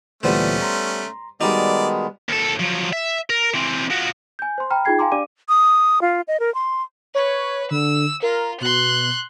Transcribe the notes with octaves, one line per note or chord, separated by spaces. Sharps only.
D2 A#2 E3 G3 A3 B3 C#4 C5
A#5 C6
D#3 G3 G#3 B3 D#4 F#4 D5
D#2 A4
F3 F#3
E5
A#4
E3 C4
F3 F#4
G#5 G6
C5 C6
G5 A#5 B5 F6
D#4 F4 G#4 G5 G#6 C7
F5 G5 G#5 A#5 C6 D6
D4 G4 D5 F5 D6 D#7
D#6
F4
D#5
A#4
C6
B4 C#5
D3 E6
F4 A#4
B2 C6 F#6